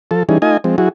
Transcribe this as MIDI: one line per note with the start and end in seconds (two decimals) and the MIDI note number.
0.11 0.23 53
0.11 0.23 69
0.29 0.38 52
0.29 0.38 55
0.29 0.38 61
0.29 0.38 63
0.29 0.38 68
0.42 0.57 57
0.42 0.57 63
0.42 0.57 65
0.42 0.57 75
0.42 0.57 80
0.64 0.76 53
0.64 0.76 56
0.64 0.76 60
0.78 0.89 54
0.78 0.89 64
0.78 0.89 66
0.78 0.89 68